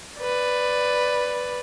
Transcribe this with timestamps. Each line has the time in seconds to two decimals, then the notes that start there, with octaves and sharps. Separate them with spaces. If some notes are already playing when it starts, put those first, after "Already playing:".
0.20 B4 D5